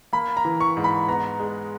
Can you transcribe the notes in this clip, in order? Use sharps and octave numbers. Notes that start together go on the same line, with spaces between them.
A#3 B5
A#5
E3
C#6
G#2
B5
B3 A#5
G#3